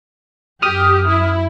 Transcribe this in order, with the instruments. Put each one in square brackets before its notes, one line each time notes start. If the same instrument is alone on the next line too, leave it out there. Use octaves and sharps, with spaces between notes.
[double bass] F#2 [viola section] G4 [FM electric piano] D#6 F6
[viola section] E4